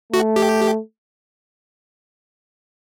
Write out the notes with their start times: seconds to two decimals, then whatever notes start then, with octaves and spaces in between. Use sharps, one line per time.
0.13 A3 F#4
0.36 G4